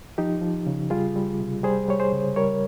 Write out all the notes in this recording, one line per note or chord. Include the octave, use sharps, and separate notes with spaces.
F3 D#4 G4
F3
C#3
G3 F4 G#4
G3
C3
G3 G#4 C5
G3 C#5
G#4 C5
C#3
G3 A#4 C#5